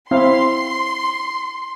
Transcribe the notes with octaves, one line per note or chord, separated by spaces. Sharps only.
C4 E4 F5 C6